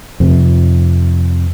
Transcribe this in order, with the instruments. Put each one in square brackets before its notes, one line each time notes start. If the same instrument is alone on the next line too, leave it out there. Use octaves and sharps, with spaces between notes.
[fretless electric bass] F2 C3